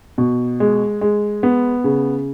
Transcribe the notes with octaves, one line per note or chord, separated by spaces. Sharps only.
B2
G#3
G#3
B3
C#3